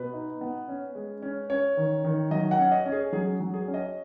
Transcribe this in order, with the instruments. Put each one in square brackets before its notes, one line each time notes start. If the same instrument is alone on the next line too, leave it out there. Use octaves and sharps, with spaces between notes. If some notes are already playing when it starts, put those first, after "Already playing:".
Already playing: [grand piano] B2 B4
D#4
B3
C#4
G#3
C#4
C#4 C#5
D#3
D#3
F#3 D#5
F#5
C#4
D#5
C#4
G#4
F#3 G#4
F#3
G#4
C#4
D#5